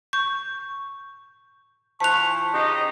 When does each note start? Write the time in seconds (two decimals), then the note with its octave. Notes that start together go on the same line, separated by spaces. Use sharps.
0.13 C#6 G6
2.00 E3 F4 C5 A5 C#6 F#6 B6 F7
2.54 C#3 D#4 G4 D#5